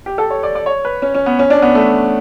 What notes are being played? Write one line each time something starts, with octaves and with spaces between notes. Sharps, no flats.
G4
A4
C#5
D5
D5
C#5
B4
C#4
C#4
B3
C#4
D4
B3
A3